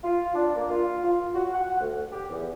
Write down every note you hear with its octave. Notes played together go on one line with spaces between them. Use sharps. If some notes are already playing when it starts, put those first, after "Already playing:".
F4
D4
A#3
F4
F4
F#4
F#5
D2
G4
E2